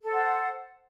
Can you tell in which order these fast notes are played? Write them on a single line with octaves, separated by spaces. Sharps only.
A4 C5 F#5